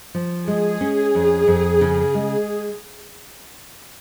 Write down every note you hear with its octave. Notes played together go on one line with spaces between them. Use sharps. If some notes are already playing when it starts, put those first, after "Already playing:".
F3
G#3 G#4
C#4
F2
F2
C#3
G#3